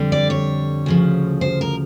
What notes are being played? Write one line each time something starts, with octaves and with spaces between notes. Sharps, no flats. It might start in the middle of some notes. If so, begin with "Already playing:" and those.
Already playing: F2 D3 G3
D5
C#5
D2 C#3 F3
C5
A#4